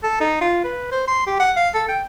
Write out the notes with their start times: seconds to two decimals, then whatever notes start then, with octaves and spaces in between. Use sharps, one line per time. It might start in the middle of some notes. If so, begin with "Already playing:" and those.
0.03 A4
0.20 D#4
0.41 F4
0.64 B4
0.91 C5
1.07 C6
1.27 G4
1.40 F#5
1.56 F5
1.74 A4
1.88 G5